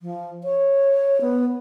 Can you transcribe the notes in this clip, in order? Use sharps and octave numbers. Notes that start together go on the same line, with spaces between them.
F3
C#5
B3